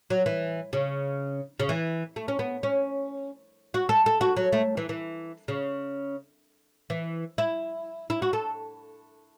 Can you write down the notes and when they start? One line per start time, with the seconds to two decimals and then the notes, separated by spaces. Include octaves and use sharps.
0.10 F#3
0.26 E3
0.73 C#3
1.60 C#3
1.69 E3
2.16 A3
2.28 C#4
2.39 B3
2.63 C#4
3.74 F#4
3.89 A4
4.06 A4
4.21 F#4
4.37 F#3
4.52 A3
4.77 E3
4.89 E3
5.48 C#3
6.90 E3
7.38 E4
8.10 E4
8.22 F#4
8.33 A4